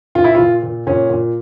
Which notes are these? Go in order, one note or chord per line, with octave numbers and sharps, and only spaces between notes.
A#2 F4
E4
A#2 F4
A#2
A#2 C#4
A#2